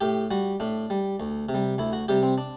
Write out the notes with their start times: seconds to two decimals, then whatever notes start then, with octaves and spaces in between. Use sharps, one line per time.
0.01 A2 G4
0.31 G3 F#4
0.60 A2 D4
0.90 G3
1.20 D2
1.49 C3
1.54 G3
1.78 D2 E4
1.93 F#4
2.08 C3 G3 G4
2.23 C4
2.38 D4